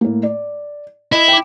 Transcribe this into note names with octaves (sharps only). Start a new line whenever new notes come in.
A2 A#3
D5
E4 D#5 E7
G5 D6